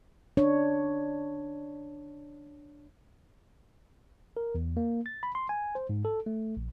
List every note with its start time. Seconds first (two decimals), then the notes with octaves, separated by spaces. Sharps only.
0.37 D4 C#5
4.37 A#4
4.55 E2
4.77 A#3
5.06 A6
5.23 B5
5.35 C6
5.49 G#5
5.75 C5
5.89 G#2
6.05 A4
6.26 A3
6.57 A#1